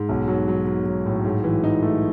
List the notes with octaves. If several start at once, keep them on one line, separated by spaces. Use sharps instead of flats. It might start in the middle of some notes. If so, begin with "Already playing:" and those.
Already playing: G#2
B1
F#3
F#3
F#3
F#3
A2
G#2
E3
D#4
A3